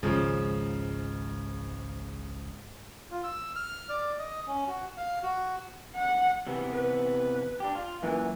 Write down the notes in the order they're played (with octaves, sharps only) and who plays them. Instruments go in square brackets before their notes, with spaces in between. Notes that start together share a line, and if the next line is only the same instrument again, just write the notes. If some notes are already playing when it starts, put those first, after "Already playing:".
[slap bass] G#1 C#2 [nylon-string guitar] G#2 [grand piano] C#3 F3
[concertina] F4
E6
F6
D5
D#5
C#4
F#4
F5
F#4
[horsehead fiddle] F#5
[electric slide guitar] C3 E3 B3
[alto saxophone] B4
[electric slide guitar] D4 G4
F4
[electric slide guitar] F#2 A#2 [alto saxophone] E3